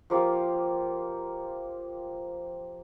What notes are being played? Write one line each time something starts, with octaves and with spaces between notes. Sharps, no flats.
F3 A#3 F4 G4